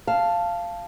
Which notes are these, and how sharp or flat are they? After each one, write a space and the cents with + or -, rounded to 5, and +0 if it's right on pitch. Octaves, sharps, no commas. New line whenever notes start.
F5 -10 A5 +0